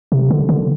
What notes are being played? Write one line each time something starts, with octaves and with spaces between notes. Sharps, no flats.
C3
D3
D3